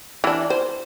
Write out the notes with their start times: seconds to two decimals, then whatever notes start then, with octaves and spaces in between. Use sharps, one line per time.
0.24 E3 D4
0.50 C5